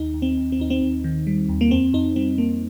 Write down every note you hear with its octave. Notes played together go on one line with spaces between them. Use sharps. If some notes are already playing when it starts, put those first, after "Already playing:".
Already playing: D#2 D#4
D#2
C4
D#2
C4
D#2 D#4
C4
D#2
D#3
G3
D#2
A#3
F2 C4
F2 D#4
G3 C4
F2 A#3